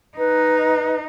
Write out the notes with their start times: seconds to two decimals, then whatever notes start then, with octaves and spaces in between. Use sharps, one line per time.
0.18 D#4 B4